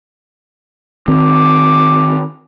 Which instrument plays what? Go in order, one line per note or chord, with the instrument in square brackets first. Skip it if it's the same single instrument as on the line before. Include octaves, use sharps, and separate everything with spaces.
[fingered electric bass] D#3 C4 [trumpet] D6